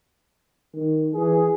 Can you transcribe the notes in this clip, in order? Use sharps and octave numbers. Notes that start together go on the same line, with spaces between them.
D#3
E3 G#4